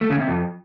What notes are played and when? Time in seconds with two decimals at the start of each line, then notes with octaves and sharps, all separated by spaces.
0.01 A3
0.10 C#3
0.19 C3
0.28 F2